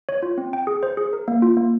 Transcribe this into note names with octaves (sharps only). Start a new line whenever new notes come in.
C#5
F4
C4
G5
G#4
C5
G#4
A#4
A#3
F4
A#3